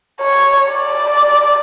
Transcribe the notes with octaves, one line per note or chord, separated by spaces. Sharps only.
C#5
D5